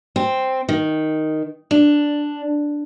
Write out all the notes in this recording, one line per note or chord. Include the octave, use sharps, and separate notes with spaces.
C4
D#3
D4